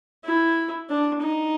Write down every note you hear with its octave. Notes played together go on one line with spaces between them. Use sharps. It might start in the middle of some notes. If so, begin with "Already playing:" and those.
E4
D4
D#4